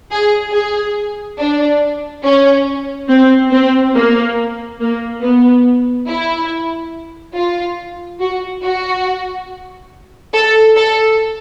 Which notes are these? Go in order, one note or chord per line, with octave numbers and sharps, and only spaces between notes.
G#4
G#4
D4
C#4
C4
C4
A#3
A#3
B3
E4
F4
F#4
F#4
A4
A4